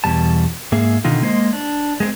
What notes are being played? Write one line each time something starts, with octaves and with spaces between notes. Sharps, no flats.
E2 B2 G3 A5
G#2 A#3 G#4 E5
B2 D3 D#3 D#4 F4
G#3 A#3 C5 D#5
D4
G#3 A#3 C4